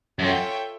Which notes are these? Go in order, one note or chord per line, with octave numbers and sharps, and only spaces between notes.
F#2 F4 A4 C#5 E5 G5